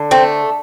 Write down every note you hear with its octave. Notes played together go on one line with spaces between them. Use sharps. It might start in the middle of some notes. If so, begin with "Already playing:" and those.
Already playing: D3
A3 C4